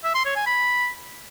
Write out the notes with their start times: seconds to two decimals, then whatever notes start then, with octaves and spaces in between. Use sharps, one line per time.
0.04 E5
0.15 C6
0.25 C#5
0.36 G#5
0.47 B5